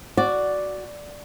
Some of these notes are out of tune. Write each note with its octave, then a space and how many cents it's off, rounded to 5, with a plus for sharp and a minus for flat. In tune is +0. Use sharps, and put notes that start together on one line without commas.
F#4 +0 D5 +0